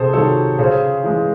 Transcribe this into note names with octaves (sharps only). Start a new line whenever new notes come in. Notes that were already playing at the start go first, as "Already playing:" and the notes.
Already playing: C3 G#4 A4 C5
D#3 F#3 A4 C#5
C#3 G#4 C5
E3 G#3